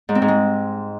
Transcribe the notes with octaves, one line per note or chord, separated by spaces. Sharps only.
G#2
C4
G#2
G#3